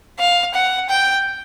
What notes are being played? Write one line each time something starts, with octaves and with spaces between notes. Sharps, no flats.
F5
F#5
G5